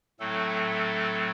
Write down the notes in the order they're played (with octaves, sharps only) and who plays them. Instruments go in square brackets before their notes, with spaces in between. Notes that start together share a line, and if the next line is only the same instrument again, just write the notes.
[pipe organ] A2 F#3 A3 C4 A4